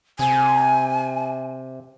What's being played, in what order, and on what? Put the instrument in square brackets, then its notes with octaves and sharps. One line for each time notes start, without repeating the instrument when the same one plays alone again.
[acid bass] C3 [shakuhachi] G#5